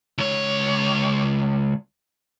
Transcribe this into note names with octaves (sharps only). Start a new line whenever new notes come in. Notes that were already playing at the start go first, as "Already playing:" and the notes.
C#2 C#5